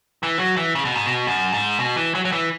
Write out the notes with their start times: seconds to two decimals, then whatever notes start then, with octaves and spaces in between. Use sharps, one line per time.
0.23 E3
0.39 F#3
0.57 E3
0.75 C#3
0.85 B2
0.95 G#2
1.06 B2
1.27 F#2
1.53 G#2
1.79 B2
1.96 E3
2.15 F#3
2.25 F#3
2.32 E3